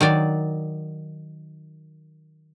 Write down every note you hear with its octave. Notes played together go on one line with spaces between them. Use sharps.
D#3 F#3 D5